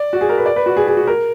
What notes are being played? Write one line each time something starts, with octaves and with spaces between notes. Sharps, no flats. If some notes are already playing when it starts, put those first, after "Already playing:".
Already playing: D5
F#4
G#4
A#4
B4
D5
B4
F#4
G#4
G#4
F#4
A#4